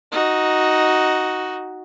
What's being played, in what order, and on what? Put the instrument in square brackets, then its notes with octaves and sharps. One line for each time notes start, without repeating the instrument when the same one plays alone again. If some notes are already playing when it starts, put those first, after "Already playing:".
[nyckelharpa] D#4 F#4